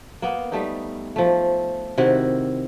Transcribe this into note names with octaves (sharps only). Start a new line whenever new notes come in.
A#3 B3
G3 A3 D#4
F3 A3
C3 D#3 E4 F#4